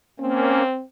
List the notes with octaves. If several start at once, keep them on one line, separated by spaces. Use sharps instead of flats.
A#3 C4 C#4